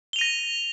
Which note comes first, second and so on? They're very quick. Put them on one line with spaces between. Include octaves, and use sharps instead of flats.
G7 F7 D#7 A#6